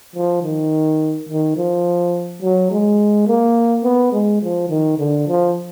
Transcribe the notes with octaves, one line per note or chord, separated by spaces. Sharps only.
F3
D#3
D#3
F3
F#3
G#3
A#3
B3
G#3
F3
D#3
D3
F3